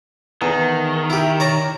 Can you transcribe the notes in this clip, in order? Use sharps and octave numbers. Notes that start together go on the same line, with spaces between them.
E2 D#3
E4 G4
C#5 D5 A#5